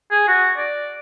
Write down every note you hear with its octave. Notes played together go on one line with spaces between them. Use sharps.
G#4
F#4
D5